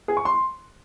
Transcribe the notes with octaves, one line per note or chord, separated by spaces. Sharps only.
G#4
C#6
C6